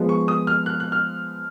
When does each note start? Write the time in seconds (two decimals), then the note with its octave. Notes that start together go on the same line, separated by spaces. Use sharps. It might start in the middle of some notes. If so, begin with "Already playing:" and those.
Already playing: F3 G#3 B3
0.09 C#6
0.28 D#6
0.47 F6
0.66 F#6
0.80 F#6
0.92 F6